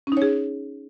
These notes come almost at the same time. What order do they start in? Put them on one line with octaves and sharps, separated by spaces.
C#4 D#4 C#5 G#4